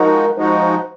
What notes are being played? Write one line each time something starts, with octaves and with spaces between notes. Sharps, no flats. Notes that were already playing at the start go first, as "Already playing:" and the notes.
Already playing: F3 G#3 D#4 F#4 A#4
F3 G#3 D#4 F#4 C5
C5